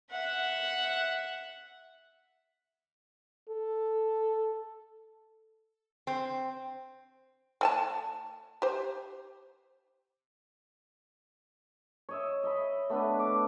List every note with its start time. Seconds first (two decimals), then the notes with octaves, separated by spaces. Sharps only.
0.11 E5 F#5
3.49 A4
6.07 C4
7.61 A3 G#5 A5
8.62 G4 C5
12.09 C#5 D#5 E5
12.43 D#5 E5 B5
12.90 A3 B3 D4 B4
13.19 D6